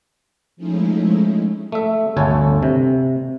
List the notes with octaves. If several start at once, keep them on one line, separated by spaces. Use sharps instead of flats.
F3 G#3 A3 C#4 D#4 E4
A3 E5
G1 D2 A4 C#5 G#5
C3